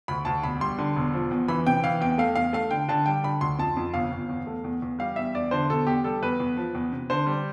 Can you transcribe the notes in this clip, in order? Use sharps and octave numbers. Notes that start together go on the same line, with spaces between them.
D2 B5
D2 A5
E1 B5
G3 C6
D3
E1
F3
E2
E3 B5
C3 G5
E3 F5
E2 G5
A3 F5
E2 F5
A3 F5
D3 G5
D3 A5
G3 G5
D3 B5
D2 C6
F2 A5
F2
G1 F5
G1
E2
A3
E2
E2
G3 F5
E2 E5
E2 D5
D3 C5
B2 A4
E2 G4
G3 A4
E2 B4
E2
F3
E2
C3
D3 C5
G3